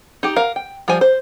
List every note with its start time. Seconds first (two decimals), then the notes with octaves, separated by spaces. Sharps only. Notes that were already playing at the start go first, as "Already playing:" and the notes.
0.23 D#4 G4
0.36 A#4 F5
0.56 G5
0.88 F3 G3 C5 G#5
1.01 C5